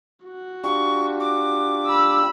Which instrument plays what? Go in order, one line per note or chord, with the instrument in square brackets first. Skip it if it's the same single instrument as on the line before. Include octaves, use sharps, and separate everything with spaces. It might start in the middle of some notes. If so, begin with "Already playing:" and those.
[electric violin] F#4
[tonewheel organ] D4 F4 G4 [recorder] C#6
[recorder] D6
[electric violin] B5 E6